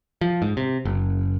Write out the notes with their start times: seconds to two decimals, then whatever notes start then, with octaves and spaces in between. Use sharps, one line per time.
0.21 F3
0.42 G#2
0.57 C3
0.85 F#1